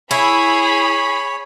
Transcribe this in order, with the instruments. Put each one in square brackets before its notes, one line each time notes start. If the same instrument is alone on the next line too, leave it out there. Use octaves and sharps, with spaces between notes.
[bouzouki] E4 [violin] G#4 [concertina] C#5 [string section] B5